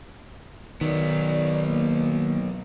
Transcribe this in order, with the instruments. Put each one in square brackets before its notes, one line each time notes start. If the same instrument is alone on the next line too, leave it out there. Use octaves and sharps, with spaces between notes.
[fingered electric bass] D#3 [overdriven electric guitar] F#3 B3 [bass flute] D5
[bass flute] A#3